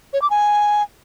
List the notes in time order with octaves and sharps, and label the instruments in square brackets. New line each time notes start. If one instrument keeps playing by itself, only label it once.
[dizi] C#5
D6
G#5